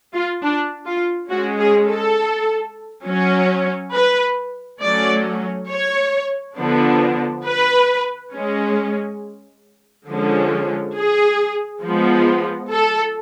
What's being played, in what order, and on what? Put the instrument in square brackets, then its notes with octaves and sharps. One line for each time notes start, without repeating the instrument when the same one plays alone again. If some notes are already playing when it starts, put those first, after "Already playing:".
[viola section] F4
D4
F4
G#3 C#4 F#4
G#4
A4
F#3 C#4
B4
F#3 A3 C#4 D5
C#5
D3 F3 B3 D4
B4
G#3 C#4
D3 F3 G#3 C#4
G#4
F3 G#3 B3
A4